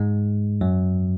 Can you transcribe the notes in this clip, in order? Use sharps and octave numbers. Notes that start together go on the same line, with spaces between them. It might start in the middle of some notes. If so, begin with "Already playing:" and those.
Already playing: G#2 G#3
F#2 F#3